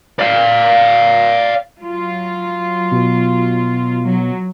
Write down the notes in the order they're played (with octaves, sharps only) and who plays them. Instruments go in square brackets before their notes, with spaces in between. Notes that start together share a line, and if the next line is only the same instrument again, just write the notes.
[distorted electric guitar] D5 F5
[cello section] F#3 F4
[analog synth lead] B2
[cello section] F#3